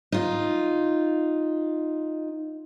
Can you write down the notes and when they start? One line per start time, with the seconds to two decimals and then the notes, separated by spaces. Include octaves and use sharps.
0.12 D#4 F4